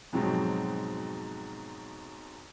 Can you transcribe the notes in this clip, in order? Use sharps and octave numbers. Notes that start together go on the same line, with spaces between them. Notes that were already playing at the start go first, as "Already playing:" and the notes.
F2 G#2 B2 F#3 C4